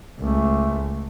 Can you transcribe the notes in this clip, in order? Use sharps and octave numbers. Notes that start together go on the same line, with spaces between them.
C#2 A3